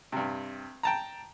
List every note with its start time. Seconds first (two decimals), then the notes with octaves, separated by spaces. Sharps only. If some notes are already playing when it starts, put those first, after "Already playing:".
0.12 G2 C3
0.83 G5 A5 A#5